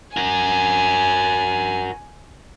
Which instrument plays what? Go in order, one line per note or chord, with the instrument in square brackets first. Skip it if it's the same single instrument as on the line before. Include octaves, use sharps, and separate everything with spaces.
[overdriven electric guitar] F#4 A#4 [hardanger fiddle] G#5